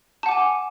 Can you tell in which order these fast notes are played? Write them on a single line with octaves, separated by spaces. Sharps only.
A5 F#5 D6 G#5